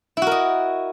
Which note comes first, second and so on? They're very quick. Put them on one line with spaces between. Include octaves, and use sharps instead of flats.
E4 F#4 A#4 D#5